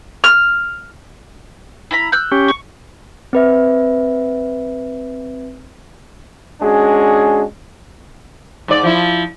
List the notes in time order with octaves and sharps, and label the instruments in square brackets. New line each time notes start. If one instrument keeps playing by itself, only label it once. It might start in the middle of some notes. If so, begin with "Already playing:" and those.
[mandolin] F6
E4 A#5 B5
E6 F#6 G6
[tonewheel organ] C#4 G4
[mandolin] C#6
[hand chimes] C4 B4 E5
[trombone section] G#3 C#4 D4 F#4 G#4
[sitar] G#2 D5
F3 E4